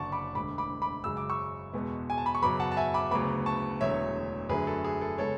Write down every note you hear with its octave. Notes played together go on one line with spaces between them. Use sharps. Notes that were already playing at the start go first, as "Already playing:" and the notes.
Already playing: F#1 F#2 D3 D5 F#5 A5 C#6
B5 D6
E1 D2 D3 B5 D6
B5 D6
B5 D6
F#2 C#3 G#3 E6
D6
C#6 E6
E2 B2 G#3 B3
G#5
A5
B5
C#6
F#2 C#3 F#3 B3 B5 D6
F#5 A5
A5
E5 G#5
B5 D6
D2 C#3 F#3 B3 B5 D6
A5 C#6
E1 E2 D3 F#3 A3 C#5 E5
F#2 D3 F#3 A3 G#4 B4
A4
G#4
A4
C#3 G#3 B3 A4 C#5